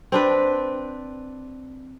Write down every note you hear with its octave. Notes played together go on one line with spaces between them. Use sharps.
C4 D4 B4